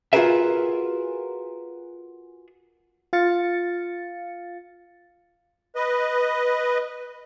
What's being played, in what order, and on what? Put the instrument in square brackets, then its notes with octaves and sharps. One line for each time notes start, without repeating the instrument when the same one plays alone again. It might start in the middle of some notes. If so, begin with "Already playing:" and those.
[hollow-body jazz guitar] F4 F#4 G#4 A#4 B4 E5
[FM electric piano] F4 F5 A6 C#7
[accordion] B4 D#5